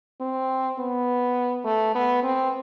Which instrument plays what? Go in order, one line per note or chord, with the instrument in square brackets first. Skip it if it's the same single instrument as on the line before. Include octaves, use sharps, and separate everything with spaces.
[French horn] C4
B3
A3
B3
C4